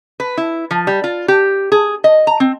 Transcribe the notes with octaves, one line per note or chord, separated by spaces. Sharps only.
B4
E4
F3
G3
F4
G4
G#4
D#5
A#5
C4